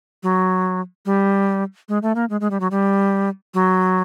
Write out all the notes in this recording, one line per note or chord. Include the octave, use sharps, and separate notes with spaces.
F#3
G3
G#3
A3
A#3
G#3
G#3
G3
F#3
G3
F#3